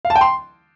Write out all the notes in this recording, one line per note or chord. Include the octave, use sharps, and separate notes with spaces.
F5
A5
G5
C6